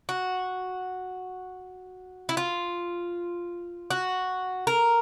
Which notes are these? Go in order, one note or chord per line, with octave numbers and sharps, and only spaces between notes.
F#4
E4
F4
F#4
A#4